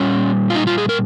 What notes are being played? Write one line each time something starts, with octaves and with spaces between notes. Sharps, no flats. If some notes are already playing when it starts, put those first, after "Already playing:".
Already playing: A#2 G3 C#4
F4
D#4
F4
G#4
A#4